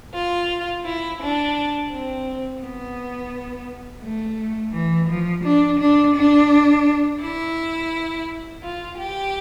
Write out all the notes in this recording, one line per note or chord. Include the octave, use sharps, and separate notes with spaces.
F4
E4
D4
C4
B3
A3
E3
F3
D4
D4
D4
E4
F4
G4